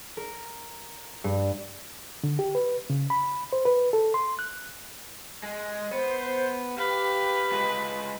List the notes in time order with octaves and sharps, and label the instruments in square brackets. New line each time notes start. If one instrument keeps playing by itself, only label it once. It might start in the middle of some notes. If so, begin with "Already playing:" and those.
[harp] A#4
G2
[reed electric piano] D3
G4
B4
C#3
B5
C5
B4
A4
C6
F#6
[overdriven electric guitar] G#3
[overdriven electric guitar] B3 [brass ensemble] C5
[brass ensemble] G4 [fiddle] B4 [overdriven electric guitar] F5
[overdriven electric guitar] G#3 F4